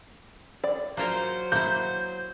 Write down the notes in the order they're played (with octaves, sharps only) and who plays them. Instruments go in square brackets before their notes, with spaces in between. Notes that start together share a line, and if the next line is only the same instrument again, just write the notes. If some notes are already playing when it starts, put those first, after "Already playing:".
[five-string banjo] D5
[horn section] F#3 C5 [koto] A#3 F4 A#4
[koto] A#3 E4 [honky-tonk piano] G6